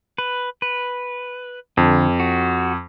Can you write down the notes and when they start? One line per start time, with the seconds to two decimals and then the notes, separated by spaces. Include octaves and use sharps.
0.18 B4
0.62 B4
1.77 F2 D3
2.20 F#4